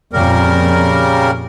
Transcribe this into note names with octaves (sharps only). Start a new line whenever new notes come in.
F2 A#2 C#3 G3 A#4